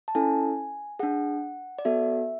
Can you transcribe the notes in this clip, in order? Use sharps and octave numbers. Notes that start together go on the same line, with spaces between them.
A5
C#4 E4 A4 G#5
D4 G#4 F#5
D5
B3 F#4 A4 E5